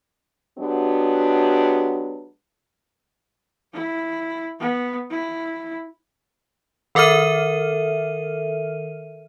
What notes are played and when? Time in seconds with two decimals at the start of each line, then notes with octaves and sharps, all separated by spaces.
0.58 F#3 G#3 B3 D4 F#4 G4
3.73 E4
4.60 B3
5.10 E4
6.95 D#3 A4 A#4 E5 F6 D#7